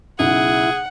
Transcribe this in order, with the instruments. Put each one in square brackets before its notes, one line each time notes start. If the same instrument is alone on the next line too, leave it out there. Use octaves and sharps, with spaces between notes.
[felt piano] B1 C#3 [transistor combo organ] E4 [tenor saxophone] G#4 [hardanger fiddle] F#5